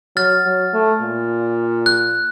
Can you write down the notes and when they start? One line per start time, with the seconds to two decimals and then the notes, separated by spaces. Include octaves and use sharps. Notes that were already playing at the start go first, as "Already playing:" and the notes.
0.16 F#3 F6 A6
0.45 F#3
0.73 A3
1.01 A#2
1.86 F#6